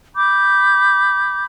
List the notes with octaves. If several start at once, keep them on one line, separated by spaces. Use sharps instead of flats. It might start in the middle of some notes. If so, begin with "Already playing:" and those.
B5 D6 G6